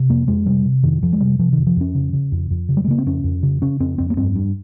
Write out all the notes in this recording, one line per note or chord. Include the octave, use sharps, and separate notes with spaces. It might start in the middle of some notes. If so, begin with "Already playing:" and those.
Already playing: C3
F2 A#3
F2 G#3
C3 G3
C3
F2 D#3
F2 F3
G#3
C3 G3
C3 F3
D#3
F2
F3
F2 C#4
C#3
C#3
F2
F2
C#3
G3
G#3
C#3 A#3
C4
F2 C#4
F2
C#3
C#3 C#4
F2 C4
F2 C4
A#3
G2 C4
G2